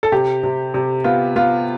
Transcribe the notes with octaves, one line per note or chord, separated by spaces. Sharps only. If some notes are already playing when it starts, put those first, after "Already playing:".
A4
C3 G4
C3
C3
B3 F4
B3 F4